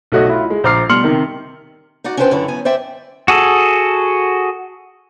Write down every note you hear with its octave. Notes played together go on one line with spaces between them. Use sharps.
B1 A3 F#4 C#5 D#5
E4 F4
G#3
A#1 C5 A#5 D6 F6 C7
B2 G3 C6 F6 C#7 F#7
C3 D#3
D#4 F#4 D5 F#5
C#4 D4 F4 B4 C5 G5
F#2 D3 E4 C#5
F#2 B3 G#5
C5 D5 E5 G5
F#4 G#4 A4